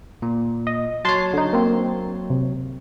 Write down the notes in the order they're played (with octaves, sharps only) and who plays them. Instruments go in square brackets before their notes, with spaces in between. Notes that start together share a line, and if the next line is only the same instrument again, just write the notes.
[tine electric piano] A#2
[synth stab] D#5
[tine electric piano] F#3 C#5 [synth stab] A5 C6
[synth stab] D3 D#4
A#3 C4
C3